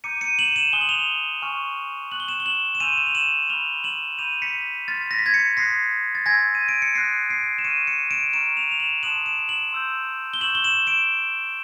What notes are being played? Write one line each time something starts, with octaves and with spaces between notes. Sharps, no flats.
A#5 D6 G6 C#7 D#7
C#7 D#7
E7 F#7
E7 F#7
G#5 C6 D#6 F#6 G7
F#7
F7 G7
G#5 C#6 F6
C#6 F#6 F#7
G7
E7 F#7
G7
E7 F#7
E7
G#5 C6 E6 G6 D#7 F7
E7
F7
E7 F#7
B5 D6 F6 F7 G7
E7 F#7
B5 D6 G6 D#7 F7
B6 C#7
C6 F6 A6 B6
A#6
B6
G#6 A#6
B6 C#7
C6 D#6 F#6 A#6 C7
A6
G#5 C6 E6 G#6 A#6
D#7
D7
C#7
C6 D#6 F#6 A#6 C7
C7 D7
E7
C#6 F6 C#7 D#7
C#7 D#7
D7 E7
A#5 C#6 F6 D7 E7
D#7 F7
F7
E7 F#7
A5 C6 D#6 F#6 E7 F#7
D7 E7
E7 F#7
C6 E6 G6
G7
C#6 E6 G6 E7 F#7
G7
E7 F#7
D7 E7